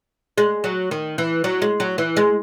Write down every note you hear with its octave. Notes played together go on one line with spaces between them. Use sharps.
G#3
F#3
D#3
E3
F#3
G#3
F#3
E3
G#3